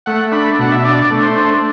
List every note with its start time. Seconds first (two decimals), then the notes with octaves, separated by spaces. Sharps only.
0.06 A3 F#5
0.32 D4 B5
0.59 B2 F#5
0.72 E5
0.85 D4 D5
1.10 A3
1.23 C5
1.36 D4